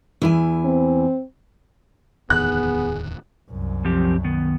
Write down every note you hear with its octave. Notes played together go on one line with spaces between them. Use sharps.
E2 E4 G#5
C4
D1 E2 D#3 B3 G#4 F#6
C2 F#2
F3 C4 G4
D#3 B3